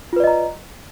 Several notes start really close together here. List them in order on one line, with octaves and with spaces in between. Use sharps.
F4 B4 D5 D#5 A#5